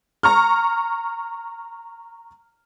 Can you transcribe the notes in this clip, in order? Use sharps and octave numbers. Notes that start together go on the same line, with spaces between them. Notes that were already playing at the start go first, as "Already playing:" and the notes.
A#5 C#6 F6